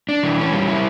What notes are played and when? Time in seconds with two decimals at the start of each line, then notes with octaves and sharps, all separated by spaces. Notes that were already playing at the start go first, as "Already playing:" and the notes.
0.09 D4
0.23 E3
0.38 C#4
0.53 G3
0.68 E4